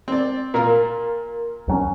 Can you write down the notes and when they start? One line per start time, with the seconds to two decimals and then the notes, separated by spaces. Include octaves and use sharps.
0.08 C4 D5
0.54 A#2 F4 A#4
1.68 D#2 F#3 C#4